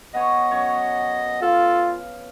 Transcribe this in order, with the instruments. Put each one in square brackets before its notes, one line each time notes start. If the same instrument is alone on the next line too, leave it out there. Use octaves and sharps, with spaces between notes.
[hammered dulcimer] B3 G#4 C#5 [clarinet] D#5 [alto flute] F#5
[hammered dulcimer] F#2 C#5
[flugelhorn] F4 [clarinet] A4 [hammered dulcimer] F5